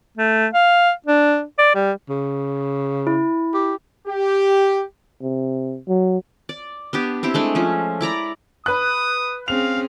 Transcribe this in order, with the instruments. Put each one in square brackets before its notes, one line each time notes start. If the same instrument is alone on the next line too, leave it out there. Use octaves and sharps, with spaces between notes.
[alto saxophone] A3
F5
D4
D5
G3
[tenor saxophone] C#3
[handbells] E4
[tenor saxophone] G4
[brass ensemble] G4
[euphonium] C3
F#3
[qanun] D5
B3 D4 G4
C4 E4 G4
G#3 A3 D4
F3 C#4
E4 D5 A#5 B5
[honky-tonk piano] B4 F#6 [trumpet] D#6
[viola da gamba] C4 C#4 G#4 [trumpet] F5 [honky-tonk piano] F7